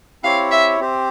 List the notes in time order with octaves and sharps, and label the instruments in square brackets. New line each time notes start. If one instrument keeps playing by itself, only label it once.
[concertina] C4 E4 G4 C#5 [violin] F5
[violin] E5
[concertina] C4 G4 C5